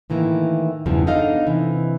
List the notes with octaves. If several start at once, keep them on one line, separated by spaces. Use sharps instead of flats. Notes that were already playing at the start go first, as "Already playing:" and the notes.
A2 D#3 E3 A#3
E2 G2 C#3 E3 F3
B3 D4 D#4 A4 D#5 F5
C3 E3